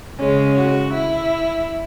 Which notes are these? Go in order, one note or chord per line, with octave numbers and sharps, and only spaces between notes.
C#3 G#3 C#4
F#4
E4